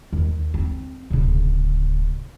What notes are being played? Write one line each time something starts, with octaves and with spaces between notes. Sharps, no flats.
D#2
C4
D1 C#3